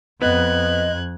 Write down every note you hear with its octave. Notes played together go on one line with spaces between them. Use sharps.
F2 B3 D#5 F#6 G#6